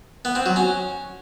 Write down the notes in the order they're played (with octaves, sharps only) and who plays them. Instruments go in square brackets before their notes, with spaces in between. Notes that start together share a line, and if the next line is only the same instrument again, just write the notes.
[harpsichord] B3
C4
F#3
C#4